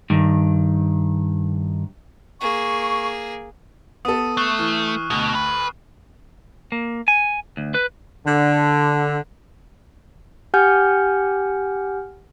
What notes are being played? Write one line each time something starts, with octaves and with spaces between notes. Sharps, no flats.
G2 D#3
A#3 G#4 C#6
B3 A4 D#6 D#7
A3 C#6 F#6 C7
E3 D#6 F6
D2 B2
B4
A#3
G#5
D2
B4
D3
G4 F#5 G#5 F6 G6